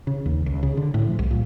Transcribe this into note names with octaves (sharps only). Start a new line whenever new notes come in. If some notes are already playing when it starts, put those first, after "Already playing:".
C#3
D#2
C#2
C#3
D3
A2
F3
C2
A#2